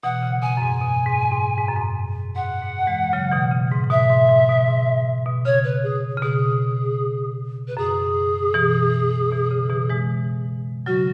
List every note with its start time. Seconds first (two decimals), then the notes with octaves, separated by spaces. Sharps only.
0.03 B2 E3 F#5
0.23 C#3
0.42 B2 G#5
0.57 F#2
0.62 G#2
0.81 B2
1.06 G#2
1.32 G#2
1.58 G#2
1.68 F#2
1.76 G#2
2.35 G#2 F#5
2.61 G#2
2.87 E3 G#3
3.13 C#3 F#3
3.32 B2 E3
3.51 C#3
3.71 G#2
3.84 G#2
3.90 B2 E5
4.10 G#2
4.29 G#2
4.40 G#2
4.49 B2
4.68 G#2
4.87 G#2
5.26 B2
5.45 C#3 C#5
5.64 B4
5.83 G#4
6.17 C#3
6.22 B2 G#4
7.68 B4
7.77 F#2 G#4
8.54 B2 E3
9.32 B2 E3
9.51 C#3
9.70 B2 E3
9.90 E3 G#3
10.86 C#3 F#3 F#4